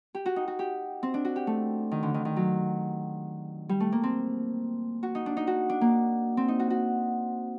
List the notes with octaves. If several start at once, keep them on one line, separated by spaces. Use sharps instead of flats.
G4
F#4
D#4
F#4
G4
C4
D4
F#4
G4
A3
D#3
D3
D#3
D#3
F#3
G3
A3
A#3
C4
F#4
D#4
D4
D#4
F#4
D4
A#3
C4
D#4
F#4
F#4